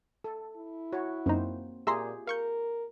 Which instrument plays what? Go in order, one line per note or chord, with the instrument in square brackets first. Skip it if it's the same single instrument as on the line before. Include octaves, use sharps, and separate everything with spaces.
[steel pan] A4
[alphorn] E4
[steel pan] F#4 C#5
[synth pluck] F#2 D#4 [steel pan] A#3 C4 C5
[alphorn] A#2 [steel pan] F4 G4 G#4 [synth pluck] E5 A#5 C6
[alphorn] A#4 [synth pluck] F5 C#6 G6